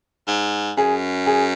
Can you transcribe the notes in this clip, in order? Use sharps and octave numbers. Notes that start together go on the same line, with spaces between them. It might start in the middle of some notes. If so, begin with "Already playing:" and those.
G#2
F#2 G#4
G#4